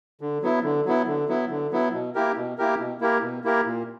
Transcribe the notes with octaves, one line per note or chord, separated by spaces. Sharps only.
D3
F#3 B3 E4
D3
F#3 B3 E4
D3
F#3 B3 E4
D3
F#3 B3 E4
B2
A#3 E4 G4 A#4
B2
A#3 E4 G4 A#4
B2
A#3 E4 G4 A#4
B2
A#3 E4 G4 A#4
A#2